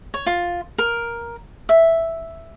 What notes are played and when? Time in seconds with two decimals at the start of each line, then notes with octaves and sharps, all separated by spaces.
0.14 C#5
0.26 F4
0.78 A#4
1.69 E5